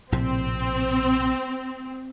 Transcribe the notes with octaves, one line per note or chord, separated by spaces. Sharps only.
A#1 A2 C3 C4